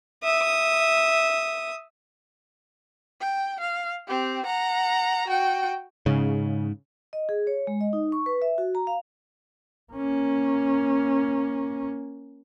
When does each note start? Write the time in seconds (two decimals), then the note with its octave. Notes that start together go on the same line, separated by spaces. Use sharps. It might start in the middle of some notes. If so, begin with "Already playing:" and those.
0.23 E5 D#6
3.21 G5
3.60 F5
4.08 C4 G4
4.46 F#5 A#5
5.27 F#4 G5
6.06 G#2 C#3
7.13 D#5
7.29 G#4
7.47 C#5
7.67 G#3
7.81 D#5
7.93 D#4
8.12 C#6
8.26 B4
8.42 E5
8.58 F#4
8.75 A#5
8.87 F5
9.93 A#3 C#4